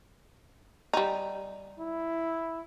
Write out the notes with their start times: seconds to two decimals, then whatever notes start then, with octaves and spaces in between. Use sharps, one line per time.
0.93 G3 D#4
1.79 E4